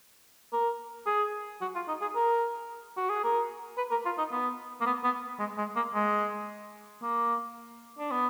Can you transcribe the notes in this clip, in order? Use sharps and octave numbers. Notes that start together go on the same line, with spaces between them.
A#4
G#4
F#4
F4
D#4
G#4
A#4
F#4
G#4
A#4
B4
A#4
F4
D#4
B3
A#3
B3
B3
G#3
G#3
A#3
G#3
A#3
D4
B3